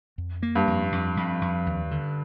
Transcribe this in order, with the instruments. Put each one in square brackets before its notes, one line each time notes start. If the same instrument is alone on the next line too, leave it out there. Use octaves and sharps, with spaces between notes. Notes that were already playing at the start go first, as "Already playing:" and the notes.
[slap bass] F2
A#3
[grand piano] G2
[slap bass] F2
F2
F2
F2
D#2
D3